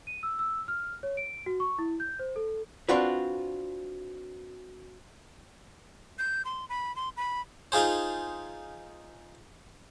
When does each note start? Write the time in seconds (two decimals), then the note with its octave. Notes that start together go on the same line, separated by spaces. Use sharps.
0.07 D#7
0.23 E6
0.39 E6
0.68 F6
1.03 C#5
1.17 D7
1.46 F#4
1.60 C#6
1.79 E4
2.00 G6
2.19 C5
2.36 A4
2.89 C4 D4 F4 F#4 B4
6.19 G6
6.45 C6
6.69 B5
6.96 C6
7.17 B5
7.72 D#4 F4 G#4 C5